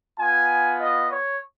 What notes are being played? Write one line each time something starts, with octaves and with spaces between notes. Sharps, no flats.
B3 F4 G#5
D#5
C#5